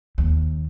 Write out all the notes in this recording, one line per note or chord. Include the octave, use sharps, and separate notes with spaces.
D#2